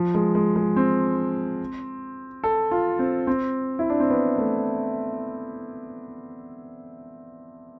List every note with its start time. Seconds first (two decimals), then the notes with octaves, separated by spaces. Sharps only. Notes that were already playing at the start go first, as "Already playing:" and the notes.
Already playing: F3
0.14 G#3
0.35 G#3
0.56 G#3
0.76 C4
2.44 A4
2.71 F4
2.99 C4
3.27 C4
3.79 E4
3.90 D4
4.00 C4
4.10 B3
4.38 A3